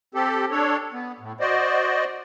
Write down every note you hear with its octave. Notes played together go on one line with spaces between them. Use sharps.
C4 G4 A4
D4 A4 C#5
B3
A2
F#4 C5 D5 D#5